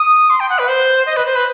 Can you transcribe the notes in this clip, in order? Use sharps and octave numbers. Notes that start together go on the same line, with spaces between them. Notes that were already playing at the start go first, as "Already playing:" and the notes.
Already playing: D#6
C6
G5
F#5
B4
C5
D#5
B4
C5
B4